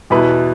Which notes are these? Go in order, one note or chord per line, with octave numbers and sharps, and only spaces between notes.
E2 B2 B3 E4 B4